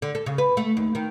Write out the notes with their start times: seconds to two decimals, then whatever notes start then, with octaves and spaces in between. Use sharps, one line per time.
0.02 D3
0.15 A4
0.26 C#3
0.38 B4
0.57 A3
0.77 D#2
0.95 D#3